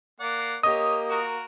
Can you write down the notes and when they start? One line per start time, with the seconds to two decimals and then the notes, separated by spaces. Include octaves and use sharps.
0.20 A#3 D5 F#5
0.63 A#3 G4 C#5 D#5 D#6
1.10 F#4 A#4